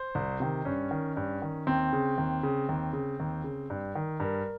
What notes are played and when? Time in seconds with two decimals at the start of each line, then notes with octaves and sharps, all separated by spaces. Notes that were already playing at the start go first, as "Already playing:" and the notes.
Already playing: C5
0.15 C2
0.40 C3 D#3
0.65 G2 C#4
0.91 D#3
1.17 G2
1.42 D#3
1.67 D#2 C4
1.93 C#3
2.18 D#2
2.43 C#3
2.69 D#2
2.93 C#3
3.20 D#2
3.44 C#3
3.70 G2
3.95 D#3
4.20 G2 A#4